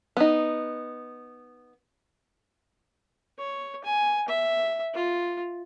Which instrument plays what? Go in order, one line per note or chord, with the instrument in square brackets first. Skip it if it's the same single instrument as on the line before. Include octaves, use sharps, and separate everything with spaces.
[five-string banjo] B3 D#4
[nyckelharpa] C#5
G#5
E5
F4